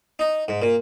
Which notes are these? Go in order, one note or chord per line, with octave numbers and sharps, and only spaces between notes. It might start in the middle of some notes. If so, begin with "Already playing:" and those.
D#4
G#2
A#2